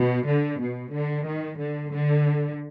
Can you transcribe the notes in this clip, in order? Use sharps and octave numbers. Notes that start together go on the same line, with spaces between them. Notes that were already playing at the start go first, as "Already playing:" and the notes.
Already playing: B2
D3
B2
D3
D#3
D3
D3